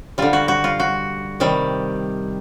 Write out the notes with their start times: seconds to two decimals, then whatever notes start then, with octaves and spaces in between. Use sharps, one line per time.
0.18 D3 G3 F4
0.33 F#4
0.48 F#4
0.64 F4
0.80 F#4
1.40 C3 D#3 G3